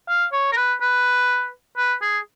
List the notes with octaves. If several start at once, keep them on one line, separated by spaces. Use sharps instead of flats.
F5
C#5
A#4
B4
B4
B4
G#4